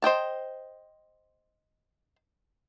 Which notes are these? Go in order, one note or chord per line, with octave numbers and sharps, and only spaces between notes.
C5 D#5 G5 A5